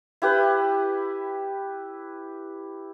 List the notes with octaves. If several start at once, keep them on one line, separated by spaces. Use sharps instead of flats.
E4 G4 B4